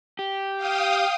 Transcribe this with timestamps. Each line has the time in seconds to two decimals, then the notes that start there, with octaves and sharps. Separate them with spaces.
0.19 G4
0.57 F5 G5 D#6